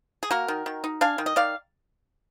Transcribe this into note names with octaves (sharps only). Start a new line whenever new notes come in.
G#4
A#3 F#4 A#4
D#3
D#3
D#4
D4 F5 G#5
D#3
D#5
D#3 D5 F5